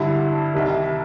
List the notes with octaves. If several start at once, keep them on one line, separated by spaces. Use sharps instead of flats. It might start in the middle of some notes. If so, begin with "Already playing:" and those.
Already playing: G2 D3 G3 E4
C2 C3 D#3 G3